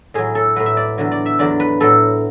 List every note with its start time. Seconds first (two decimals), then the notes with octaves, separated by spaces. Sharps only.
0.14 A2 F#3 G#4
0.35 A4
0.56 A2 F#3 B4
0.66 E5
0.77 D5
0.98 E2 D3 F#3
1.11 D5
1.26 E5
1.39 E2 D3 F#3 D5
1.60 B4
1.80 A2 F#3 A4